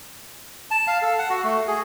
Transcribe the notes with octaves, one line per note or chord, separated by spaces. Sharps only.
A5
F5
A4
F#5
F#4
A3
G#4